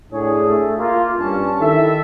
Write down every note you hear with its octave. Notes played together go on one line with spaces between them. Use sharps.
A2 D4 G#4 C#5
A3
A#3 F4
G2 C#4 A5
D#3 E4 A4 E5